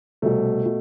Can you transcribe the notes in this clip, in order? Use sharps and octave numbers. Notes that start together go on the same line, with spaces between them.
C2 B2 A3
B2